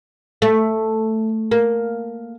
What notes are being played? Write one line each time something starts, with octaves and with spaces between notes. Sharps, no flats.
A3
A#3